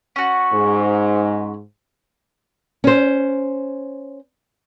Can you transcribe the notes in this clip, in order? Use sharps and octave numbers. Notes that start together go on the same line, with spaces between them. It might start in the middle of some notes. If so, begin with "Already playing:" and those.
C#4 F#4
G#2
C#4 C5